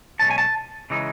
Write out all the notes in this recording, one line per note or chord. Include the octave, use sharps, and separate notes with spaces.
B1 B2 G#3 C#4 A5
G#5
A5
C#3 E3 G#3 D#4